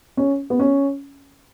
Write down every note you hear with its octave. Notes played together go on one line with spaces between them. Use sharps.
C#4
B3
C#4